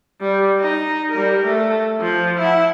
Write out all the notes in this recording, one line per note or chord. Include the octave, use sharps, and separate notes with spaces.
G3
D#4
G3 A#4
A3
F3
E4 F#5